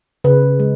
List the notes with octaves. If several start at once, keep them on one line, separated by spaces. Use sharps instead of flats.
C#3 B4
G#3